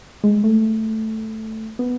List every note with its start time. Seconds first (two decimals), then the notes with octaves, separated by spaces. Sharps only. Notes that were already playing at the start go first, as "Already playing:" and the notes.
0.24 G#3
0.44 A3
1.79 B3